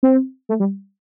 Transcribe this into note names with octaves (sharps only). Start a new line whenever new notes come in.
C4
A3
G3